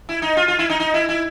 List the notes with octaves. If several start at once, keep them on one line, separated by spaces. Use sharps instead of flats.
E4
D#4
F4
F4
E4
D#4
D#4
E4
E4